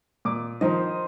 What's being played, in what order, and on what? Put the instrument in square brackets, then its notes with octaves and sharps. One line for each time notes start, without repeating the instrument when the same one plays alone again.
[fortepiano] A#2 D6
[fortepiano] D#3 F3 [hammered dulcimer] D#4 C5 D#5